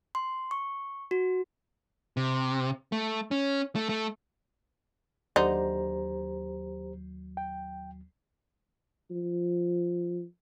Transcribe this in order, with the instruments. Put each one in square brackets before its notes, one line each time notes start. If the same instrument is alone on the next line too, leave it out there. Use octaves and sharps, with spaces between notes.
[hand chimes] C6
C#6
F#4
[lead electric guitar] C3
A3
C#4
A3
A3
[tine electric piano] D#2 F#3 [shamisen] D3 D#4 [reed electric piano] G4 C5 A#5
[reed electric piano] G5
[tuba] F3